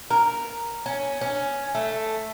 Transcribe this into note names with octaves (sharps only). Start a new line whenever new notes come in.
A#4
C#4
C#4
A3